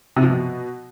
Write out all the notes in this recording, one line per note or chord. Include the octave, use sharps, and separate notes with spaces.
C3
F3
B2